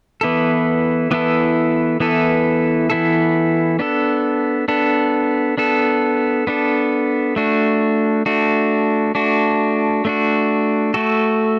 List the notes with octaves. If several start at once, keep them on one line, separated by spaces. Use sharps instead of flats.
E3 B3 E4 A4
E3 B3 E4 A4
E3 B3 E4 A4
E3 B3 E4 A4
B3 D4 A4
B3 D4 A4
B3 D4 A4
B3 D4 A4
A3 D4 F#4
A3 D4 F#4
A3 D4 F#4
A3 D4 F#4
A3 F#4 A4